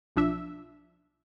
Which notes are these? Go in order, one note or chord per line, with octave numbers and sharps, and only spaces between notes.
B1 F3 D4 E5